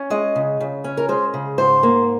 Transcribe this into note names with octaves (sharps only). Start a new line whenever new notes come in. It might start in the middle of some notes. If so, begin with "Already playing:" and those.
Already playing: C#4
G#3 D#5
C#3
C#3
C#4
A#4
G#3 C5
C#3
G#2 C5
A#3